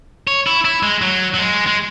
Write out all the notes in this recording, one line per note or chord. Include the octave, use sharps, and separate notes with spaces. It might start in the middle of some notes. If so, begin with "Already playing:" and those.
C#5
E4
E4
G#3
F#3
F#3
G#3
G#3